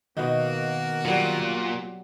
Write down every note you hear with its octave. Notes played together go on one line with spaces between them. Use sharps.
B2 D#3 A#3 D#4 F#4
A#2 F#3 G3